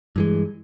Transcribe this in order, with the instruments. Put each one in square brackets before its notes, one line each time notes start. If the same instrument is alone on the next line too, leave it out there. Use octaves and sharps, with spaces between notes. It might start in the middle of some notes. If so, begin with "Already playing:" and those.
[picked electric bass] G2 E3 G#3